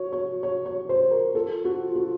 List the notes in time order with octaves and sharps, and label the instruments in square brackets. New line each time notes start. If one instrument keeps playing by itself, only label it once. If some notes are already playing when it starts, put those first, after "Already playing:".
Already playing: [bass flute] F#4 [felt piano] C#5
[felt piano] C#5
C#5
C#5
C5
A#4
[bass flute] F4 [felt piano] A4
[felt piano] F#4
F#4